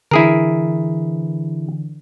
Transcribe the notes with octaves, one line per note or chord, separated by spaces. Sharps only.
D3 E3 E4 G#4 A#4